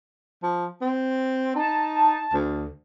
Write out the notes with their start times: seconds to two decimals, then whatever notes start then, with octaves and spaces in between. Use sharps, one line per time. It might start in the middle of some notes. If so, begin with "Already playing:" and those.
0.43 F3
0.81 C4
1.55 D#4 A5
2.33 D2